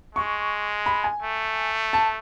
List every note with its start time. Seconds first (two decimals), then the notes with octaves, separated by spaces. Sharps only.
0.15 G#3 C#6
0.86 B5
1.04 G#5
1.22 A3
1.93 A5